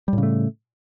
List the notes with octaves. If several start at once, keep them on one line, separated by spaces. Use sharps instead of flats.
A2 C#3 G3 A3